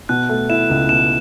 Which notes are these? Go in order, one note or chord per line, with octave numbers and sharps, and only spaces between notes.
B2 F#6
A3
E4 E7
C#2
B2 E7